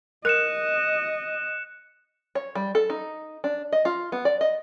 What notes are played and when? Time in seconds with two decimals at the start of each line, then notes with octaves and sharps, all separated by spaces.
0.25 A#4 D#5 F#6 C#7 E7
2.35 C#5
2.55 G3
2.75 A4
2.90 D#4
3.44 D4
3.73 D#5
3.85 F4
4.12 B3
4.25 D5
4.41 D#5